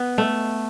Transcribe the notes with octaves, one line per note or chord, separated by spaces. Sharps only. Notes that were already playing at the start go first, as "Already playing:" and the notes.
Already playing: B3
A3